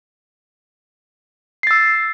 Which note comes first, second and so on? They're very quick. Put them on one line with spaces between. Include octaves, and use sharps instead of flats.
C7 A6 E6